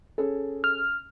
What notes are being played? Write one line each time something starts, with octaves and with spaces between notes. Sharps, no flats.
C#4 G#4 A4
F6